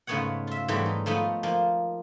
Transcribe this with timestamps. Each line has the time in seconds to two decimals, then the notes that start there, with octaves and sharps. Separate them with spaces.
0.07 G#2 C#3 A3 B3 C#5 F#5
0.47 F4 E5
0.68 G#2 B2 E3 F#3 G3 A3
0.86 D#4
1.06 F3 A3 B3 D#4
1.43 F3 A#3